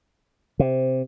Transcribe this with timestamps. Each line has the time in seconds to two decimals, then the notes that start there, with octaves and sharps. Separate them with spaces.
0.59 C3